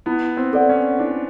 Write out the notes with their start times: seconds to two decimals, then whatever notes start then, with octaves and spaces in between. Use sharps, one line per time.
0.06 B3 E4
0.37 C4
0.53 A4 D5 F#5
0.69 C#4
0.99 D4 E4